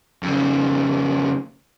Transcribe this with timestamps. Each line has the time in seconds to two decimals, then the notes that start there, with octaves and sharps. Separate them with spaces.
0.23 F2 C#3